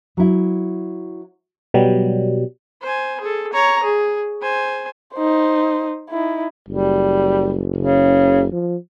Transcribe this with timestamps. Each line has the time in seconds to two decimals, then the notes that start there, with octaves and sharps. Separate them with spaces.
0.17 F#3 E4
1.74 B2 F#3 G3
2.82 C5 G#5
3.20 G#4 A4
3.53 C#5 A#5
3.83 G#4
4.42 C5 G#5
5.15 D#4 C5
6.09 D#4 E4
6.68 F#1 G3
7.77 C#3
8.52 F3